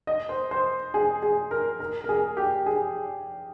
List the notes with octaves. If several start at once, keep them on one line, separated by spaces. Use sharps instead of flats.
D#5
C5
C5
G#4
G#4
A#4
A#4
A#4
G#4
G4
G#4